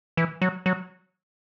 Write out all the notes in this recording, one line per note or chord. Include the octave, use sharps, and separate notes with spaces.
E3
F#3
F#3